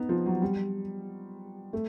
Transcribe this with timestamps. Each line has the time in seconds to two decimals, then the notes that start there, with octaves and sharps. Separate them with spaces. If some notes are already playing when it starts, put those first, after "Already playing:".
Already playing: B3 D#4
0.09 F3
0.26 F#3
0.42 G3
1.73 A3